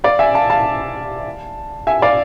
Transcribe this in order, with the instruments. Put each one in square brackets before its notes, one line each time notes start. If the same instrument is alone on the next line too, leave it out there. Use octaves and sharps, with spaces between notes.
[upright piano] D5 F5
E5 G#5
F5 A5
F5 A5
E5 G#5
D5 F5